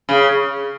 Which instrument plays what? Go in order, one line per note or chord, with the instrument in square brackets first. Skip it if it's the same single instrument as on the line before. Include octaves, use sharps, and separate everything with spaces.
[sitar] C#3